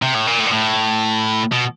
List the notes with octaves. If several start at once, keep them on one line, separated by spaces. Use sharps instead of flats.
C3
A2
A#2
A2
A#2
A2
B2